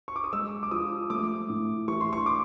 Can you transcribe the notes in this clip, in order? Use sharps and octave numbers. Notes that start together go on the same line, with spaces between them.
C#6
D6
D#6
G#3 E6
D6
F3 D#6
A3 D6
A2
E3 C#6
C6
C#6
D6